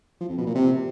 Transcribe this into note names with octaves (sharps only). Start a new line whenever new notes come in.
F3
F2
B2
A#2
C3